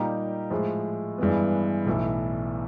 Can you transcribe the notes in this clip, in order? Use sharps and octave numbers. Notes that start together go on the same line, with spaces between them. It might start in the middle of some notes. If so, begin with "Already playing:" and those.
Already playing: A#2 G3 A#3 D#4 G4
A2 F3 G#3
G2 E3 G#3 B3
B1 A2 E3